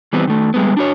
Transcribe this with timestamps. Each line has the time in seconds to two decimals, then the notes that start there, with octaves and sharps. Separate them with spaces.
0.13 E3 G3 B3 C4
0.27 D#3 A3
0.54 G3 G#3 B3
0.77 D4 F#4 C#5